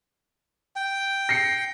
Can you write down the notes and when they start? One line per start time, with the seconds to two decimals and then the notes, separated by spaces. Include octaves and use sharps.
0.76 G5
1.29 A#6 C7 C#7